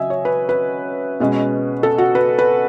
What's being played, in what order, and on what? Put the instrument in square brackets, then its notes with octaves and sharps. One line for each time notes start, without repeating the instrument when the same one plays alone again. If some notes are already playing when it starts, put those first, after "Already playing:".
Already playing: [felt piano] C#3 F#3 D#5 E5 G#5
C#5
B4
B4
B2 G#3 C#4
A4
F#4
B4
B4